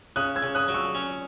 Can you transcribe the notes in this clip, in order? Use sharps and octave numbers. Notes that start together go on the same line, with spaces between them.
C#3 D#6 F#6
E6 G#6
C#3
D#6 F#6
F#3
C#6 E6
C#4